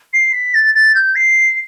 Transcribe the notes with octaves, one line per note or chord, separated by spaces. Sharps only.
C7
B6
A6
A6
G6
C7